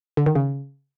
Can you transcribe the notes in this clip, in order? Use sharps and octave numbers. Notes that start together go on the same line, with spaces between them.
D3
D#3
C#3